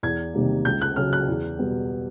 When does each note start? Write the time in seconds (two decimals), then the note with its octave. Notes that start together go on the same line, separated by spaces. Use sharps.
0.03 E2 G#6
0.34 C3 D#3 G3 A#3
0.65 C#2 G6
0.81 F#6
0.96 C#3 F#3 F6
1.13 F#6
1.28 E2
1.59 B2 G3 B3